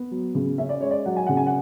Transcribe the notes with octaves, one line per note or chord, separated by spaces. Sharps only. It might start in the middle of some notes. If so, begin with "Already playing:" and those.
Already playing: B3
F#3
C#3
C#4 E5
D5
G#3 C#5
D5
F#3 F#5
G#5
C#3 F#5
G#5
F#5